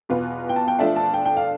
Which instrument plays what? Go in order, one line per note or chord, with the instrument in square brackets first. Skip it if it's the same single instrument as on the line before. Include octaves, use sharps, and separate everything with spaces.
[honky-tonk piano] E2 B2 B3 F4 B4
[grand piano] G5
A5
G5
[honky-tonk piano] F3 A3 D4 F4 A4 [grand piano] E5
[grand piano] A5
G5
G5
F5